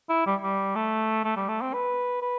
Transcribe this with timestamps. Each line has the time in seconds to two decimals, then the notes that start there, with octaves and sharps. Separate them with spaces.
0.09 E4
0.26 G3
0.43 G3
0.76 A3
1.24 A3
1.37 G3
1.49 A3
1.61 C4
1.74 B4
2.22 B4